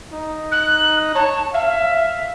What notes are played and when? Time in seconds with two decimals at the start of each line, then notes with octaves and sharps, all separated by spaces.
0.13 D#4
0.51 F#6
1.15 C#5 A5
1.54 E5 F5